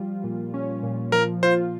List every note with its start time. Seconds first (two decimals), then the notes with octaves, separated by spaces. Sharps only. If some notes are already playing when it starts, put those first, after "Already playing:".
Already playing: F3 G3 F4
0.24 A#2
0.54 C#4
0.83 A#2
1.12 F3 A#4
1.43 F4 C5